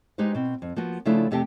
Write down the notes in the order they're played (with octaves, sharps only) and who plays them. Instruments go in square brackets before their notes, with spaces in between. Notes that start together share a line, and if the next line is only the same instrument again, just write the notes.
[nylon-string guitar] G#3 D#4 G4 B4 C5
B2 C4
F2
F3 A#3 B3 F#4
C#3 F3 A3 D4 E4 F4
F2 C3 A3 G4 G5 A5